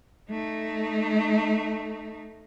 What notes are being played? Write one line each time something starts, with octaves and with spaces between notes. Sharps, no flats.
A3 D#4